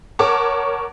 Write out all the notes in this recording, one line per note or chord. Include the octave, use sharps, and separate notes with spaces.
A#4 C#5 F#5 A5 C#6 D6